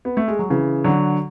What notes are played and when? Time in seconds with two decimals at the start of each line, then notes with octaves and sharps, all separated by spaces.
0.05 B3
0.17 A3
0.28 G#3
0.39 F#3
0.50 C#3 E3
0.84 D3 F#3